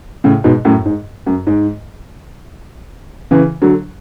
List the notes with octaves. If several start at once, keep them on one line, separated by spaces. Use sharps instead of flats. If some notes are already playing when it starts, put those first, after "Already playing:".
A2 C#3
G#2 B2
F#2 A2
G#2
F#2
G#2
C#3 E3
D3 F#3